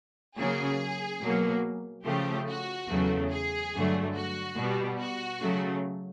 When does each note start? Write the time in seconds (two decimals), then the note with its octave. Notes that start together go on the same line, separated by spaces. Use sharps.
0.37 C#3 F#3 A#3 G#4
1.21 B2 F#3 A#3
2.05 C#3 F3 A3 G4
2.48 F#4
2.89 E2 C#3 F#3 A3
3.31 G#4
3.74 G2 D3 F#3 A3
4.15 F#4
4.57 B2 G3 B3
4.99 F#4
5.41 C#3 F#3 A3